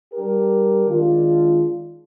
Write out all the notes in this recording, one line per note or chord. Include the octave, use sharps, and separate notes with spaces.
G3 D4 G4 A#4
D#3 G#3 D4 F4